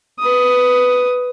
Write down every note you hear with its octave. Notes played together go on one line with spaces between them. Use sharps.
B4 D#6